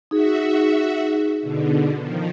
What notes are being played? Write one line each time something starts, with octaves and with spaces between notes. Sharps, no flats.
D#4 F#4 G#4 E5
B2 D3
D#3 F3